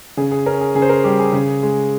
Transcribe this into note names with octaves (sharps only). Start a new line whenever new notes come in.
C#3 G#4
G#4
C#4 A#4
G#4
C#3 G#4
C5
A#4
G3 G4
G#4
C#3
G#3